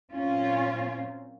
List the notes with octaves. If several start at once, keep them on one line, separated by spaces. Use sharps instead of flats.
A#2 F#3 C4 C#4 F4